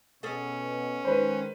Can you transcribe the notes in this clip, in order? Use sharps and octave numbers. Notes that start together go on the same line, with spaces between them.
B2 C#4 G#4 A4 D#5
D#3 G#3 B4 C5